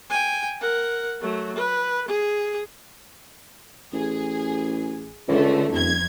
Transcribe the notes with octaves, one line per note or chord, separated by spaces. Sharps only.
G5 G#5
A#4 F#5
F#3 A3
B4
G#4
A1 G#4
C#2 D3 A3
D#1 F2 G#6